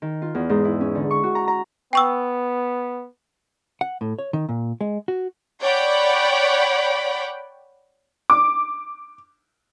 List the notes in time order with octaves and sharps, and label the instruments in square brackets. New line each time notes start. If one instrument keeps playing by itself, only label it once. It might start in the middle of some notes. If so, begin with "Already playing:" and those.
[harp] D#3
F4
E2
G#2
E4
C#4
D3
C#6
F#4
A#5
A#5
[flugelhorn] B3 [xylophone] G5 C#6 E6
[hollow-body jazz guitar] F#5
A2
C#5
D#3
A#2
G#3
F#4
[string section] C#5 D5 F#5 G5 B5 D6
[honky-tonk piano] D6